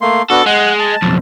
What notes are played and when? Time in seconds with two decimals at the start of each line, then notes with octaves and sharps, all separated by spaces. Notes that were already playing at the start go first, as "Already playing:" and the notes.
0.01 A3 A#3 C6
0.30 B3 D4 F#4 A4
0.46 G#3 F#5
0.80 A5
1.02 B1 F2